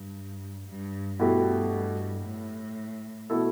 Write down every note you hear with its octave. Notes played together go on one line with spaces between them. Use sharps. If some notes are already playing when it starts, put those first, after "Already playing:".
Already playing: G2
G2
G2 B2 A3 E4 G4
A2
B2 A3 E4 A4